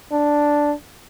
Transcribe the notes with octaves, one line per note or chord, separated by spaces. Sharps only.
D4